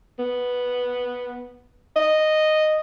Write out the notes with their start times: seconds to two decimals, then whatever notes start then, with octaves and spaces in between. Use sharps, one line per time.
0.19 B3
1.96 D#5